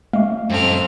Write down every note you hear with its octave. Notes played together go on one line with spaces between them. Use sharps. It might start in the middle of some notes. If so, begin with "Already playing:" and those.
G#3 A3 F5
F#2 C4 A4 F6